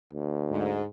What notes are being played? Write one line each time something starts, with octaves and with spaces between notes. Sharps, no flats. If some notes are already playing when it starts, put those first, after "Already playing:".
D2
G#2